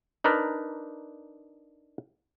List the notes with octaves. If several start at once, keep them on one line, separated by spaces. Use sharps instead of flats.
D4 D#4 A#4 B4 D5